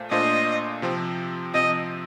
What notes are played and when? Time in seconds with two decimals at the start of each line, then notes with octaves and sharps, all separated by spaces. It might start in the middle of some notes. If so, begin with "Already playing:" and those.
Already playing: A#2 A3 F4 C5
0.11 A#2 A3 D4 F4 C5 D#5
0.82 C3 F3 C4
1.54 C3 F3 C4 D#5